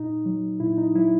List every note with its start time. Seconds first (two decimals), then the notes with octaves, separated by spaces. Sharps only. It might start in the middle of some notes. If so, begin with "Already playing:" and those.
Already playing: A#2 D#4
0.26 F#3
0.60 A#2 E4
0.78 D#4
0.95 F#3 E4